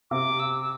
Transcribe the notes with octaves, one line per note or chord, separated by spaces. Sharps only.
C3 D6
E6
E6